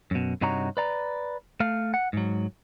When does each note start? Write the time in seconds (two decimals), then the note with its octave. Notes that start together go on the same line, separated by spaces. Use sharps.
0.11 F#2 B2
0.41 G2 C3 D#4 F#4 C#5 A#5
0.77 B4 D5 A#5
1.60 A3 F5
1.94 F#5
2.13 G#2 F#3